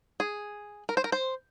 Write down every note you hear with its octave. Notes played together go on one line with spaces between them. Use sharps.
G#4
A#4
C5
A#4
C5